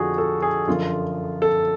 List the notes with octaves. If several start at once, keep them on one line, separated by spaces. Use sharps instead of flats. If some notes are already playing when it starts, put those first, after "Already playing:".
Already playing: F2 D3 F3 F#4 G#4
A4
G#4
F#2 D3 F3 F4
A4